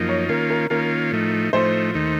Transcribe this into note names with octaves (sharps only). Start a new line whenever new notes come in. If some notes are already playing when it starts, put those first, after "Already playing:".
Already playing: F#2 F3 A#3 D#4
C#5
D#3 A#3 C#4 F4 A#4
A#4
D#3 A#3 C#4 F4 A#4
A2 F3 A3 D#4
A2 F3 A3 D#4 C5
D#2 D#3 A3 D#4